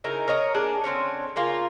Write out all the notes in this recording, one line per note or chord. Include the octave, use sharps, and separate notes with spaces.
C#3 D#4 E4 A#4
A#4 C#5 D#5 A#5
A#3 D4 G#4
D3 C4 C#4 C#5
C#3 A#3 F4 A#4